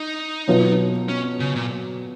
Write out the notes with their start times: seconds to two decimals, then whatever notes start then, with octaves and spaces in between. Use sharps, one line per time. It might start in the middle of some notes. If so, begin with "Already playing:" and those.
Already playing: D#4
0.48 B2 F#3 B3 F4
1.09 C#4
1.40 C#3
1.55 A#2